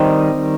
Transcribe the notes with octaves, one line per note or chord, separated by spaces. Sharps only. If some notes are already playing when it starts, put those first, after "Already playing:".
Already playing: D#3 G3 C4 D#4